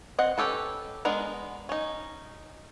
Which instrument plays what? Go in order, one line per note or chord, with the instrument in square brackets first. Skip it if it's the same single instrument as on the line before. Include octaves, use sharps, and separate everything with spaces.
[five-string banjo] C4 D#5 F#5
C#4 G4 A4 B4
G#3 B3 D4 A#4 F#5
C#4 D#4